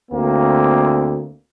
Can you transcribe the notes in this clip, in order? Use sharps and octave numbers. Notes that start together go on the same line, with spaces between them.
D2 A#3 C4